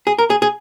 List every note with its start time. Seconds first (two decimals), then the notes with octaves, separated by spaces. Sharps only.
0.07 G#4
0.18 A#4
0.30 G#4
0.42 G#4